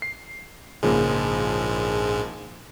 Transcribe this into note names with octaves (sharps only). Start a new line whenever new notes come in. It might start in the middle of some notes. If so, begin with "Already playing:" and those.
C7
A#1 G#2 C#3 F3 G#3 A#3